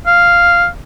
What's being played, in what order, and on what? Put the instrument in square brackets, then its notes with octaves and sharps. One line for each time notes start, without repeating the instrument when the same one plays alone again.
[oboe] F5